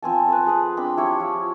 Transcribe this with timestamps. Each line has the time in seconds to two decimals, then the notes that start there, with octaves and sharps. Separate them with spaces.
0.03 F3 C4 G#5 A5
0.28 A4 B4
0.47 G#4 B4
0.77 C4 D4 B5
0.97 E4 G4 C#5
1.20 F3